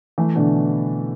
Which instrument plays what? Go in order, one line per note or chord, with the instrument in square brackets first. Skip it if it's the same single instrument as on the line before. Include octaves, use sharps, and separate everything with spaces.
[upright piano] E3 [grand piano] A3
[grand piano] B2 [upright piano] D3